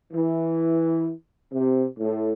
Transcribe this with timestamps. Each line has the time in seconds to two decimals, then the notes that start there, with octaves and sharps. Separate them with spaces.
0.13 E3
1.53 C3
1.99 A2